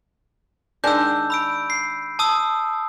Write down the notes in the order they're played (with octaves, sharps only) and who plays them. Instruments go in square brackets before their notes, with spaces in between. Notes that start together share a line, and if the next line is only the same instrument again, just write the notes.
[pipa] D#3 G#3 D4 [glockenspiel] E6 G6
[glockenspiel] B5 E6 D7
C7
A5 D#6 E6